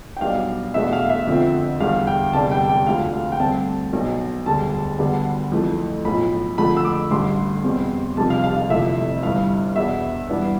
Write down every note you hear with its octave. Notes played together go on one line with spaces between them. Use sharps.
G5
B1 B2 G3 D4 F5
E2 B2 A3 D4 E5
F5
E5
F2 D3 F3 C4
E2 D3 G3 F5
G5
F1 E2 D3 G3 D4 A5
G5
G5
D2 D3 F3 A3 F5
F5
G5
G2 D3 A3 C4 A5
B1 B2 B3 D4
E1 D2 D3 G3 A5
D2 D3 G3 B3
F2 E3 A3
B1 A2 F3 B5
F2 D3 F3 A3 B5
E6
D6
A1 G2 D3 A3 C6
E2 B2 G3 C4
F1 F2 C3 G3 D4 A5
F5
F5
F5
G1 F2 C3 E3 A3 E5
G1 G2 E3 F5
E2 B2 B3 D4 E5
G2 E3 B3 D4